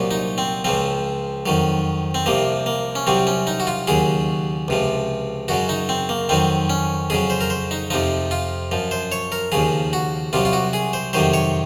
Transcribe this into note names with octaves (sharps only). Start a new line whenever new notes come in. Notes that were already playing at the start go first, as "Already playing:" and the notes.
Already playing: C2 A#2 F#3
D#4
C4
C#2 C#3 F3 C4
F2 D#3 F#3
C4
C2 C3 F3 A#3
A#3
C#4
C2 C3 F#3 C4
C#4
D#4
F#4
F4
D#2 C#3 F#3 G#4
C#2 C3 F3
F#2 C#3 F#3 F#4
D#4
C4
A#3
F2 D#3 F#3 C4
C#4
F2 C#3 F#3 G#4
C5
A#4
C5
D#4
F2 C3 F3 D#4
F4
F#2 F3
C5
C#5
A#4
D#2 C#3 F3 G#4
F#4
C2 C3 F#3 F4
F4
F#4
G#4
C5
F2 C3 D#3 F#3 C5
C#5